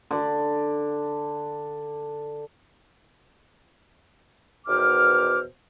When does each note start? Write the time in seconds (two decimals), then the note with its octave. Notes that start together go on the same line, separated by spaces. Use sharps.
0.11 D3 D5
4.67 E2 B2 D#3 C5 D6 F6